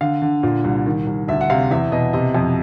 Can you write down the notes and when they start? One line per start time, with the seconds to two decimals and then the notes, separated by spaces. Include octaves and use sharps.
0.01 D3 F5
0.22 D3
0.43 A#2
0.64 C2
0.86 D#3
1.07 C2
1.28 D2 E5
1.41 F#5
1.50 C3 F5
1.71 E2 E5
1.92 B2 D#5
2.13 C3 D#5
2.35 F2